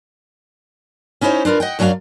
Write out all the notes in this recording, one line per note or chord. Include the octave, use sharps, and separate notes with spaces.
C#4 D#4 E4 F#4 C5 C#5
D4 F4 A#4 B4
D#5 F#5 G5
F#2 F#3 D4 G#4 F5